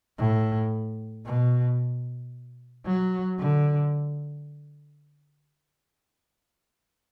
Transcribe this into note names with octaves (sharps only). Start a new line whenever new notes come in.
A2
B2
F#3
D3